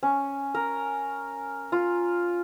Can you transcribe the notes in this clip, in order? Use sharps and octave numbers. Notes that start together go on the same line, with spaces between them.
C#4
A#4
F4